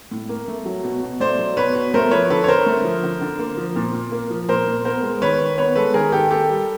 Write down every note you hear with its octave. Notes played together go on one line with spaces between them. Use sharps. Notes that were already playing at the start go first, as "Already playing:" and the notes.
A2
A#3
A3
F#3
B2
B2
A3 C5 D5
F#3
B2 B4 C#5
B2
A3 A#4 C5
F3 B4 C#5
D3 A4 B4
C#5
D3 A#4 C5
A3
F3
D3
D3
A#3
F3
A#2
A#2
A#3
F3
A#2 A#4 C5
A#2
B3 A#4 C5
G#3
D#3 B4 C#5
D#3
B3 B4 C#5
G#3 A4 B4
D#3 G#4 A#4
D#3 G4 A4
A#3 G4 A4
G3